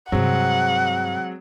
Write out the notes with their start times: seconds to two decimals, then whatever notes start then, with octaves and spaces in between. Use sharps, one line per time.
0.12 G2 C3 F#3 G#3 C4 F#5